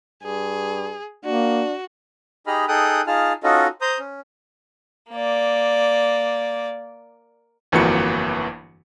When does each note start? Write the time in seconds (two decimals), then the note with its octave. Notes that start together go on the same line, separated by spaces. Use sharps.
0.23 G2 G#4
1.25 A#3 D4 F#4
2.47 D#4 G4 G#4 D#5 B5 F6
2.68 D#4 G#4 A4 G5 D#6 F#6
3.07 D#4 F4 G#4 A5 F6
3.44 C#4 D#4 F4 F#4 A4 D#5
3.81 C5 A#5 D#6 G6
3.99 C#4
5.11 A#3 D5
7.72 G1 F2 E3 A#3 F#4 C#7